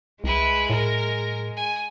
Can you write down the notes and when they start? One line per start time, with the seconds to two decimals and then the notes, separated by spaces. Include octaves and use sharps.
0.24 C2 G#3 E4 B4
0.70 A2 A#4
1.56 G#5